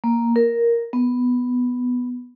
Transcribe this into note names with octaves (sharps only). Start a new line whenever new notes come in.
A#3
A#4
B3